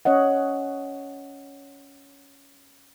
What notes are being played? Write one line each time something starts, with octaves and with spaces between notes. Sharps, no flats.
C#4 C#5 D#5 F#5